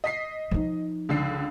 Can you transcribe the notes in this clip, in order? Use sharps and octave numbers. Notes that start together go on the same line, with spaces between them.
D#5 B6 C7
F3 D#4
C#2 D3 C7